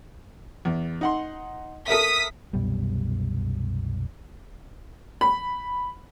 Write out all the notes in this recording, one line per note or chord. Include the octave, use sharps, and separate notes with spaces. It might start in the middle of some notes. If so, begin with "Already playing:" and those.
E2
D#4 F#5 C6
A4 A#4 E5 D#6 B6
C2 F#2 B2 G3
B5